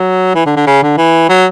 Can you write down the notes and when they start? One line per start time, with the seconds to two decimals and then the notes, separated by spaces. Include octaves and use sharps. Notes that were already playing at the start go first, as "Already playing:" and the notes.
Already playing: F#3
0.35 E3
0.46 D3
0.56 D3
0.67 C#3
0.83 D3
0.98 E3
1.29 F#3